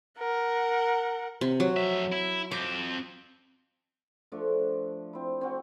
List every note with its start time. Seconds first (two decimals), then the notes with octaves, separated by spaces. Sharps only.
0.19 A#4 F#5
1.41 C3
1.60 F#3
1.77 F2 E5
2.12 E4
2.51 F2 C4 D6
4.32 F3 A3 D4
5.13 C4 E4
5.41 C4 F#4